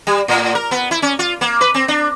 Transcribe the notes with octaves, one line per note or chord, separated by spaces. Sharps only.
G3
A2
A#4
B3
E4
C#4
F4
A#3
B4
C4
D4